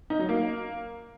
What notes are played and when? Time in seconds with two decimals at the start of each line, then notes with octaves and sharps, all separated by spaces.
0.10 D#4
0.19 F#3
0.29 A#3